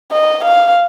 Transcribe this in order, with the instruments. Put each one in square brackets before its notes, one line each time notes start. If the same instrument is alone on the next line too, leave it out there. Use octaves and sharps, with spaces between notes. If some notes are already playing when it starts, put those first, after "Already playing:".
[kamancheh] D#5
F5